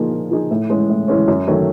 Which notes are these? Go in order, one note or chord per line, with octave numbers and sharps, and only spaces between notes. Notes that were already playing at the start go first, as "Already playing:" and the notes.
Already playing: A#2 F3 A#3 D#4 G#4
A#2
F3 A#3 D#4 G#4
A2
E3 G#3 C#4
A2
E3 G#3 C#4
F#2
D#3 F#3 A3 C#4